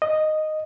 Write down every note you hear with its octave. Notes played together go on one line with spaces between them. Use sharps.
D#5